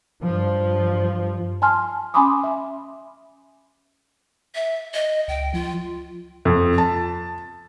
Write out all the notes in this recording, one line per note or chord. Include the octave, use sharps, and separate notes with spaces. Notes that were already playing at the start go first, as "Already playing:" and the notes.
G2 F3
G#5 A5 C6 F6
C#4 G#5 B5 C6 D6 D#6
E5
E5
D#5
C#2 G5
F3 F4
F2
A5